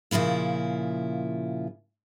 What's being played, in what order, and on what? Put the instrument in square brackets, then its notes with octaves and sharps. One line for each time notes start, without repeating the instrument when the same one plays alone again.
[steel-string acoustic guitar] A#2 C#3 F3 E4 F4